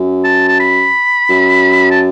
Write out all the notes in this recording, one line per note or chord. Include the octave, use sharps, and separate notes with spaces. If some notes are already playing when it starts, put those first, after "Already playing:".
Already playing: F#2
A5
A5
B5
F#2
A5